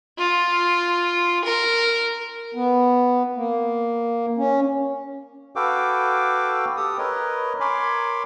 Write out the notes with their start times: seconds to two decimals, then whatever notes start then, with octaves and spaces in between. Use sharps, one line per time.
0.19 F4
1.45 A#4
2.55 B3
3.36 A#3
4.38 C#4
5.56 F#4 A4 B4 F5 G5 D6
6.77 G4 A4 D#6
6.98 A#4 B4 C#5 D#5
7.60 A#4 C#5 G#5 B5 C6 D6